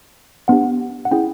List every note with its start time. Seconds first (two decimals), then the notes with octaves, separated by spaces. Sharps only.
0.48 B3 D4 G4 F#5
1.05 F#5
1.11 C#4 E4 G#4 G5